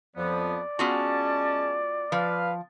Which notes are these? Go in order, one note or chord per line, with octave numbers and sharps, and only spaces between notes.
F2 F3 B3 D5
G#3 B3 C#4 F4 F#4 A5
F3 B4 F5